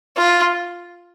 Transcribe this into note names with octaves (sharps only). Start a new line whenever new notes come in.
F4